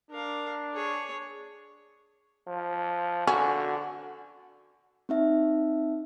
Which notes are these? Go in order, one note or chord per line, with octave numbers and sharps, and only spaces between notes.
D4 A#4 F5
G#4 C#5
F3
D3 C#4 F#4
C4 D#4 E5